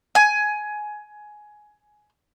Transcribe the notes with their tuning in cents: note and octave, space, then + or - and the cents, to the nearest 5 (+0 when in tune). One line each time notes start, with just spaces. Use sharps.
G#5 +15